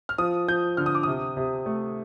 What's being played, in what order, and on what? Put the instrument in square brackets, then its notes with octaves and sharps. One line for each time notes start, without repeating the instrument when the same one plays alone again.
[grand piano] F6
F3 D#6
F3 G6
D3 F6
D#6
D6
C3 D#6
C3
A3